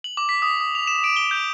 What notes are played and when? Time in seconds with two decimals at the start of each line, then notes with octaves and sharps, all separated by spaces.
0.04 F#7
0.17 D6
0.29 B6
0.42 D#6
0.60 D#6
0.75 F7
0.87 E7
1.04 D7
1.16 G7
1.31 G6